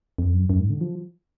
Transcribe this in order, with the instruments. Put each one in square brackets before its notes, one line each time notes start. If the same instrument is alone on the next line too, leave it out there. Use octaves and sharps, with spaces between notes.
[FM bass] F2
F#2
F#2
G#2
D3
F3